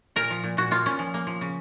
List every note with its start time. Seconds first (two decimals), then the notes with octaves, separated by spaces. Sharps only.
0.16 A#2 A#4
0.30 F3
0.44 A#2
0.57 A#2 F#4
0.71 A#3 F4
0.86 A#2 C#4
0.99 F3
1.14 A#3
1.27 F3
1.41 C#3